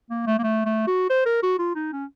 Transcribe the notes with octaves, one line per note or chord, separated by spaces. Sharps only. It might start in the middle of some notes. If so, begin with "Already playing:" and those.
A#3
A3
A#3
A3
A3
F#4
C5
A#4
F#4
F4
D#4
C#4